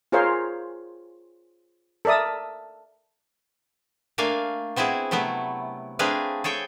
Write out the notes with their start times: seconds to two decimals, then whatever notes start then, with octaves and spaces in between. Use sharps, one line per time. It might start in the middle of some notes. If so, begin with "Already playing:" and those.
0.12 F4 G#4 A#4 C5 C#5 F5
2.05 A4 A#4 D5 E5 D#6
4.18 A3 A#3 D4 F5 G#5
4.76 B3 C4 E4 F#4 G#4
5.11 C3 F#3 A3 B3 E4
5.99 A3 C4 D4 G#4 B4 F5
6.44 G#4 A4 C#5 G5